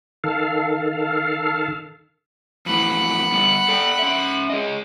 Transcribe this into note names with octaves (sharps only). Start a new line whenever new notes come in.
D#3 A4 F5
F2 A2 E3 F#5 B5
G3 B3
A4 D5 G5
C#4 E5
G#4 C#5 D#5